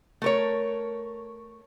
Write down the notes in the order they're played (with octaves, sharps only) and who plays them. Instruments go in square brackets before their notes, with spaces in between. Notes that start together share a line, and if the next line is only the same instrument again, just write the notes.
[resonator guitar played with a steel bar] A3 A#4 C#5